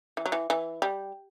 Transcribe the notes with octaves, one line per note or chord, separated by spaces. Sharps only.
E3
F#3
E3
E3
G3